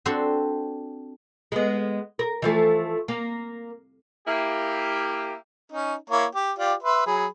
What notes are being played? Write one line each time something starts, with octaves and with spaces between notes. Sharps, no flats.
C4 D4 F#4 A4 C5 C6
G#3 B3
A#4
E3 F3 A3
A#3
A#3 E4 G4
C#4 D#4
A#3 E4 C#5
G4
F4 G4 D5
B4 E5 C6
F#3 G#4 B5